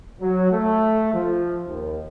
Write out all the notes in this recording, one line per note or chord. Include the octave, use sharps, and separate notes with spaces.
F#3
A3
F3
D#2